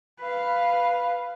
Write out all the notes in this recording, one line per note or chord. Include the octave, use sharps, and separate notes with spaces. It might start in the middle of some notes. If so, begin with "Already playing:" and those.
B4 F5